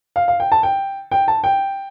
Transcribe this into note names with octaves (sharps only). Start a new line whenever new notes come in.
F5
F5
G5
A5
G5
G5
A5
G5